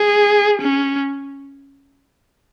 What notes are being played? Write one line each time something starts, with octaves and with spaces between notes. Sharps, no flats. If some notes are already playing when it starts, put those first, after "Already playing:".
Already playing: G#4
C#4